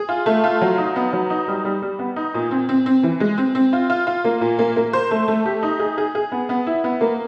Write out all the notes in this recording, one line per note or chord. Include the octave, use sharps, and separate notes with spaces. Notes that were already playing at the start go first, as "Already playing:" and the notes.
Already playing: G#4
F4
A3
F4
F#3
D#4
B3
F#3
D#4
G3
G3
G3
B3
D#4
A#2
C4
C4
C4
E3
G#3
C4
C4
F4
F4
F4
A#3
A#2
A#3
A#3
C5
A3
A3
G4
D#4
G#4
G#4
G#4
B3
B3
E4
B3
A#3